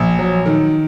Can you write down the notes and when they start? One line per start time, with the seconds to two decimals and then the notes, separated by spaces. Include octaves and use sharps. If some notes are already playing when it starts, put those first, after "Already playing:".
Already playing: A#1
0.19 F#3
0.46 D#3